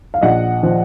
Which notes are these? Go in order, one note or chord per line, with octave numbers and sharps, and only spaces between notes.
F5
A#1 D#5 F#5
F3